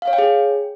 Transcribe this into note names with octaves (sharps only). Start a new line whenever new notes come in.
F5
C#5
G5
G#4